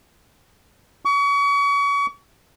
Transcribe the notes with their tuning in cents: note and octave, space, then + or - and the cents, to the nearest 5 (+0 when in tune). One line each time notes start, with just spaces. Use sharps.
C#6 +35